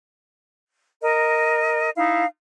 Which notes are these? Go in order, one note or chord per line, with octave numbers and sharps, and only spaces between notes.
A#4 D#5
D#4 E4 F5